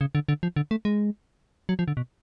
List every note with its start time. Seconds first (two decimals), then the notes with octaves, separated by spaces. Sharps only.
0.01 C#3
0.15 D3
0.29 D3
0.43 F3
0.56 D3
0.71 A3
0.85 G#3
1.69 F#3
1.79 F3
1.88 D3
1.97 B2